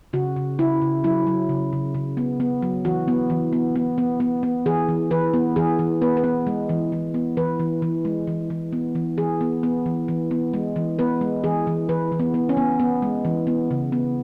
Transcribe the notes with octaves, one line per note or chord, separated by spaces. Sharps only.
C#3 F#4
C#3
C#3 E4
C#3
F#3 E4
F#3
C#3
C#3
C#3
B3
B3
F#3
E3 F#4
B3
E3
B3
B3
B3
B3
B3
E3 G#4
E3
E3 B4
B3
E3 G#4
E3
B3 B4
B4
B3
G#3
E3
E3
B3
E3 B4
E3
E3
G#3
E3
E3
B3
E3
E3 G#4
B3
B3
E3
E3
B3
G#3
E3
B3 B4
G#3
E3 G#4
E3
E3 B4
E3
B3
B3
C#4
B3
B3
G#3
E3
B3
C#3
B3